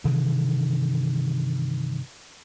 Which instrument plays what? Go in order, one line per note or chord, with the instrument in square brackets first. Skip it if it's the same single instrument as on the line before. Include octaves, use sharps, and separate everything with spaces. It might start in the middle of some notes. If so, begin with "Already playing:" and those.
[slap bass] G2 C3 D#3 E3